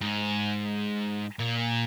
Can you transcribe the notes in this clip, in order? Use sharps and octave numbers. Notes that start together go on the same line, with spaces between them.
G#2
A#2